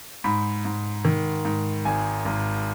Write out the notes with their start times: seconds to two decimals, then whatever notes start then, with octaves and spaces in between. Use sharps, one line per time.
0.24 G#2 B5
0.65 G#2
1.05 D#3
1.45 G#2
1.85 G#1 G#5
2.25 G#1